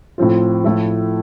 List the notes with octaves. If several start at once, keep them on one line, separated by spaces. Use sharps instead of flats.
A2 F3 C4 F4
A2 F3 A3 E4